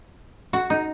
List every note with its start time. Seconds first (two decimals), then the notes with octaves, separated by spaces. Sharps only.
0.53 F#4
0.70 D#4